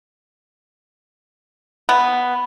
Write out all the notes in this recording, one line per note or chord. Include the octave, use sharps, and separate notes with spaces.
B3